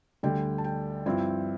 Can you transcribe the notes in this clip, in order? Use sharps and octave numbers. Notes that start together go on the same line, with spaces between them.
D2 D3 G3 G5
A5
G5
G2 F3 C4 E4